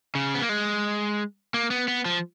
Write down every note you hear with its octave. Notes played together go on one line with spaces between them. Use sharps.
C#3
B3
A#3
G#3
A#3
B3
B3
F3